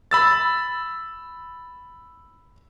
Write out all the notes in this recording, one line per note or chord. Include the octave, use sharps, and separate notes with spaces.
B5 E6 A6